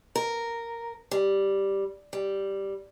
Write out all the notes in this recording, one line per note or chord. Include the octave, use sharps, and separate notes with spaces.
A#4
G3
G3